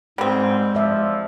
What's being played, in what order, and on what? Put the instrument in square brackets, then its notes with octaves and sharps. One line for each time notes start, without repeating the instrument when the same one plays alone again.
[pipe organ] G#2 [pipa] G3 C4 [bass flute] G#3
[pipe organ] F3 [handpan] D5 E5